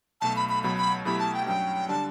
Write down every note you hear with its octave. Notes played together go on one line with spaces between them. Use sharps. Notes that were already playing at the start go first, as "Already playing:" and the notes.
B1 B2 A3 A5
B5
B5
C#2 B2 F#3 B5
B5
B2 F#3 A3 E4 G4 B5
A5
G5
G2 F#3 C#4 G5
D3 G3 D4 A5